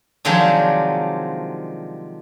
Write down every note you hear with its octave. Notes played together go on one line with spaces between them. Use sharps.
C3 D#3 F3 F#3 G#3 D4